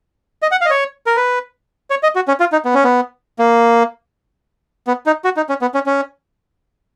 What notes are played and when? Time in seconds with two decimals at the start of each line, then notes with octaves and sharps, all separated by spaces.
0.42 D#5
0.51 F#5
0.61 F5
0.66 D#5
0.70 C#5
1.06 A#4
1.17 B4
1.90 C#5
2.03 D#5
2.15 F#4
2.28 C#4
2.40 F4
2.52 D#4
2.65 B3
2.74 C#4
2.84 B3
3.39 A#3
4.87 B3
5.06 D#4
5.24 F#4
5.37 D#4
5.49 C#4
5.62 B3
5.74 C#4
5.86 C#4